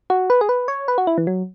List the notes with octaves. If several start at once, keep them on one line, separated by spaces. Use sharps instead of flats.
F#4
B4
G#4
B4
C#5
B4
F#4
E4
E3
F#3